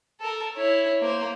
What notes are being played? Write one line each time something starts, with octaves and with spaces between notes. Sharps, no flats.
A4 A#4
E4 C#5
A#3 C5